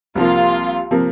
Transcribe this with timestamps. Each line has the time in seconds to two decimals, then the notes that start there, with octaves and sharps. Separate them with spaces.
0.15 C2 C3 F3 A#3 F4
0.91 C3 F3 A#3